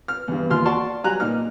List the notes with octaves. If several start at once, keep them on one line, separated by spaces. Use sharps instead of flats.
F6
E2 G2
D#2 F4 C6 F6
F#4 D5 A5 C6 C#6
F#3 G3 G#5 A#5 F#6
A#2 D#4 F6